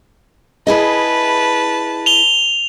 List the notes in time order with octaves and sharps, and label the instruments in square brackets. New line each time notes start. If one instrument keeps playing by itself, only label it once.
[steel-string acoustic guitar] E4 G#4 D#5 [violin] B4 A5
[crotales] F7 G7